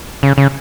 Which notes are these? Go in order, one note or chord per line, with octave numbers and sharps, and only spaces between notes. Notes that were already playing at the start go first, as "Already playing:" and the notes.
C#3
C#3